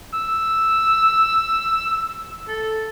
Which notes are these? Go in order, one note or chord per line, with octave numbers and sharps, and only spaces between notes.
E6
A4